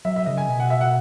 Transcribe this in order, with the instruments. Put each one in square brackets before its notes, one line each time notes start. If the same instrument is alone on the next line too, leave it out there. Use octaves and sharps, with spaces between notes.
[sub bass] F#3 [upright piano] E5
[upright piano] E5
[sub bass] C#3 [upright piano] D#5
[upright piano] G#5
[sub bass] B2
[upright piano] F#5
E5
F#5